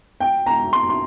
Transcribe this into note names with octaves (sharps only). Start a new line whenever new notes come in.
G5
A#5
C6
C6